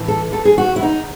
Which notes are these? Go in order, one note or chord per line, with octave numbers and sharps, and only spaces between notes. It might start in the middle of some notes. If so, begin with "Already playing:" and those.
Already playing: A2 E3
A4
A4
G#4
F#4
E4
D#4